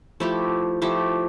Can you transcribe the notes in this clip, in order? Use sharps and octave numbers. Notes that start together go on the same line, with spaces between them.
F3 A3 E4 G4
F3 A3 E4 G4